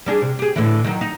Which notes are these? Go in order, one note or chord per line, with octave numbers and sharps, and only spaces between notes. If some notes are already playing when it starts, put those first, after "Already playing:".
G3 D4 G#4
C3
G4 G#4
A2 D3 E3
D#3 F#3
D#4